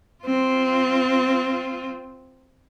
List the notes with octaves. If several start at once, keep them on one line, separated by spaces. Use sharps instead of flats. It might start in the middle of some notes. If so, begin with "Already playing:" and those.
C4 F4